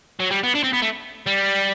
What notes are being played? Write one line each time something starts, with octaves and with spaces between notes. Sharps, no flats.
F#3
G3
B3
D4
C4
B3
A3
G3